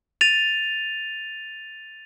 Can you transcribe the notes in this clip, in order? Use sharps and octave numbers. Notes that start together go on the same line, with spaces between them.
A6 D#7 F7